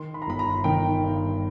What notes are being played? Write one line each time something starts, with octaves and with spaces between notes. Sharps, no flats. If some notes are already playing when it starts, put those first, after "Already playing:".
Already playing: D#3 C6
B5
A#5
G1 B5
A#5
D#3 G5
G2